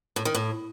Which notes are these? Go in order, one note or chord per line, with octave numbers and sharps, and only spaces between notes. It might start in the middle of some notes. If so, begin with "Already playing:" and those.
A2
D#3
A2